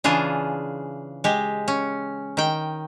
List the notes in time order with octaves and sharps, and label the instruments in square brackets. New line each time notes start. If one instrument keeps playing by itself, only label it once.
[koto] C#3 E3 D4 F4 G#4
G#3 G4
C#4
D#3 G5